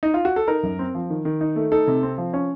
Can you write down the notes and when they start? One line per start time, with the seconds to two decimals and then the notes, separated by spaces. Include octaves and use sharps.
0.03 D#4
0.14 F4
0.25 F#4
0.36 A4
0.48 D#4 A#4
0.63 F#2
0.79 C4
0.95 F3
1.10 D#3
1.25 D#3
1.41 D#4
1.56 A3
1.72 D#4 A4
1.87 C3
2.03 C4
2.18 F3
2.33 C#4